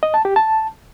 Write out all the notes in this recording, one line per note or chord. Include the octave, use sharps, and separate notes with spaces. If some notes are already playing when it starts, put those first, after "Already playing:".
D#5
A5
G4
A5